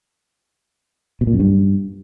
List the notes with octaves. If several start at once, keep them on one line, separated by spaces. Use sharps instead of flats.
B2
A#2
F#2
G2